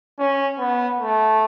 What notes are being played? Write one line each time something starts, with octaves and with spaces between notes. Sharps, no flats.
C#4
B3
A3